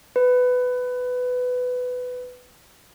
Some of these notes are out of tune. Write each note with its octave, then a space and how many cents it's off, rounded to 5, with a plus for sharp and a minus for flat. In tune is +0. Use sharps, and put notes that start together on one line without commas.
B4 +15